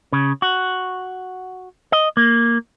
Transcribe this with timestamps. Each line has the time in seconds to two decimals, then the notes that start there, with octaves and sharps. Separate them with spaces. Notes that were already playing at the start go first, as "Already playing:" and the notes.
0.12 C#3
0.42 F#4
1.92 D#5
2.17 A#3